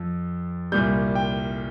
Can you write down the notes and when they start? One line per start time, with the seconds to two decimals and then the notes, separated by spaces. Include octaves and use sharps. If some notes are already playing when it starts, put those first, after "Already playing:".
Already playing: F2 F3
0.72 C2 A#2 G3 G6
1.15 G5